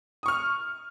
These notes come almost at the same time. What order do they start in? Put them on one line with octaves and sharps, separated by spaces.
D#6 C#6 F6